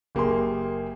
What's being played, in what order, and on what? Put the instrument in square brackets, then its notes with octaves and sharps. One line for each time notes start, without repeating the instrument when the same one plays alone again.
[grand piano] F#1 A#3 G4 G#4 C6